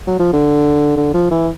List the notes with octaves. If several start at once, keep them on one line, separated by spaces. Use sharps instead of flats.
F#3
F3
D3
D3
F3
E3